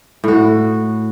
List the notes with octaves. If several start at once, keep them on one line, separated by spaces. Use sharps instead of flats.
A2 F#4